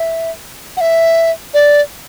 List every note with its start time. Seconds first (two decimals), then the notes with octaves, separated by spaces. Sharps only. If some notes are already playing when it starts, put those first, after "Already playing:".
Already playing: E5
0.77 F#5
0.81 E5
1.54 D5